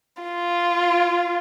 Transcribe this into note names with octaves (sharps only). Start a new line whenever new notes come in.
F4